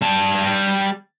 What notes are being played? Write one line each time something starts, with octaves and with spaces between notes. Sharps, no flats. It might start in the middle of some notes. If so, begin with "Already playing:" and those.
G3 A5